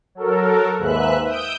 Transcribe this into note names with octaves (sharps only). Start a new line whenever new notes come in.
F#3 A4 A#4
D#2 G#2 B4 E5 F#6
D#6 E6 G6 D7